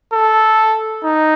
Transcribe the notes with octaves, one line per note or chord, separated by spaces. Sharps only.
A4
D#4